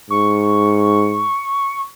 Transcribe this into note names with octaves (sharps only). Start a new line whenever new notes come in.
G#2 C#6